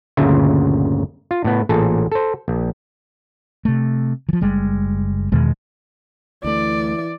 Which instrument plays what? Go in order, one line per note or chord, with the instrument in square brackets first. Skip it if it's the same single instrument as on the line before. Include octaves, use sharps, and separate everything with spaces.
[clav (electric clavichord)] G1 D2 A#2 C#3 F4 E5
F4
A2 B3
A1 A#2 G#4 A4 A5
A4 C5
A#1
[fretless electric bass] C3 A3
E3 F3
F#1 G3 G#3
E2 B2 D#3 G#3
[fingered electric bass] D2 A3 [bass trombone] E3 [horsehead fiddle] D5